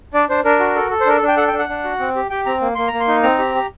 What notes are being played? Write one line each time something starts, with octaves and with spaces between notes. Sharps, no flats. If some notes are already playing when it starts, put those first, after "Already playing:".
D4 D5
D4 C5
D4 A#4
F#4
A4
A4
C5
D4 A#4
A4
D4
G5
A4 F#5
G5
D4
F#5
D4
F#4
C4
G4
G4 G5
C4 A#5
A#3
A#3 C6
A#5
A#3
C6
D#4
C4 A#5
G4
G4